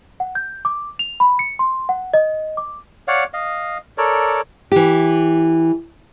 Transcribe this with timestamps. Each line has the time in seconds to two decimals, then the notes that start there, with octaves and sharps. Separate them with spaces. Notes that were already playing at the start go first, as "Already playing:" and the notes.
0.20 F#5
0.35 G6
0.65 D6
0.99 F7
1.20 B5
1.39 C#7
1.59 C6
1.89 F#5
2.14 D#5
2.57 D6
3.08 C#5 D5 F5 F#5
3.34 D#5 F5
3.98 A4 A#4 C#5 D5
4.72 E3 G4